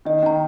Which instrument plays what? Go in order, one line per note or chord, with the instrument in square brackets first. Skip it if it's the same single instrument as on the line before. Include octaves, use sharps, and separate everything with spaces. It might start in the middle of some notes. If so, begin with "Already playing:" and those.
[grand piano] D#3 [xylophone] D#5
[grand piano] D#3 [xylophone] G5 A#5